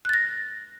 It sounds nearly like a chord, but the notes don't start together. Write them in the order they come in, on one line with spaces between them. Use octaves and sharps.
F#6 A6 A#6